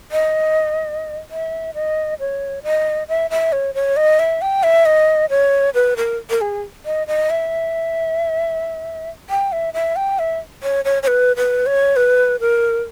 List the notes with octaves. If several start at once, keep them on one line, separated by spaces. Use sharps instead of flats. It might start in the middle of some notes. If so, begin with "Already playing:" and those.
D#5
E5
D#5
C#5
D#5
E5
E5
C#5
C#5
D#5
E5
G5
E5
D#5
C#5
B4
A#4
A#4
G#4
D#5
D#5
E5
G5
E5
E5
G5
E5
C#5
C#5
C#5
B4
B4
C#5
B4
A#4